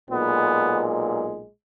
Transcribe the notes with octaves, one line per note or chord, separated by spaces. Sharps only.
B1 A#2 G#3 B3